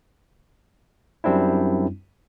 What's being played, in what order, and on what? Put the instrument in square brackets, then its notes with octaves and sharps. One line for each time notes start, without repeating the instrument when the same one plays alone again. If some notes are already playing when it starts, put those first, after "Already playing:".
[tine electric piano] F#2 G3 C4 D4 E4